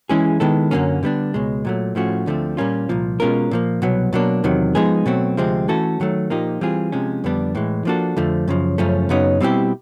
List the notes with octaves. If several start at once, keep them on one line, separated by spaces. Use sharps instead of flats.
E3 G#3 C#4 E4 G#4
D#3 G#3 B3 E4 A4
F#2 D3 F#3 A#3 C#4
D3 G3 B3 D4
C#2 B2 G#3
A#2 F#3 A3
A2 F3 A3 C#4 F#4
D2 D3 F3 A3 C4
A#2 G3 A#3 C#4 F4
C2 A#2 F3
B2 G#3 C#4 F4 A#4
A#2 F3 A#3
C2 B2 F#3 B3
B2 F#3 A#3 D4
E2 C3 D#3 F#3
F3 G#3 B3 D#4 G#4
B2 F#3 A3 C4
D2 C3 F3 G#3 C4
E3 A3 C#4 F#4 A4
D#3 F#3 A3
A#2 F3 A#3 D#4 G4
E3 G3 C4 F4 G#4
C3 F3 G#3 C#4
F2 D3 G3 B3 D4
A2 E3 G#3
F3 A#3 D4 F#4 A4
F2 D3 F3 A3
F#2 C#3 F3
F#2 C#3 F3 A3 C#4
F#2 C#3 F#3 B3 D#4
B2 G3 C4 E4 G4